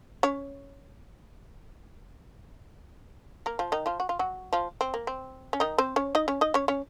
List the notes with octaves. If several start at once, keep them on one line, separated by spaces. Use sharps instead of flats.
C#4 C#5
A#3 A#4
F3 F4
D#3 D#4
F3 F4
F#4
F4
F#3 F#4
F3 F4
C4
A#3
C4
C#4
D#3 D#4
C4 C5
C#4 C#5
D#4 D#5
C#4 C#5
D#4 D#5
C#4 C#5
C#4 C#5